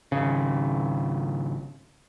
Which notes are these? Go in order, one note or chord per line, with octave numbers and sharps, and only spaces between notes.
G#1 C#3